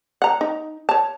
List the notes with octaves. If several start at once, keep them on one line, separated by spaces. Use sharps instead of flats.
F#5 A#5
D#4
C#5 A5